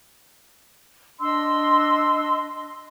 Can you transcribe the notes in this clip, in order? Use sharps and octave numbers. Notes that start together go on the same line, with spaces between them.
D4 D#5 C6 E6